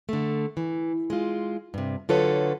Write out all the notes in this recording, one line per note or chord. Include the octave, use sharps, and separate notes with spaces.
D3 A3
E3
G#3 F4
G2 C3
D3 F#3 F4 A4 B4 C#5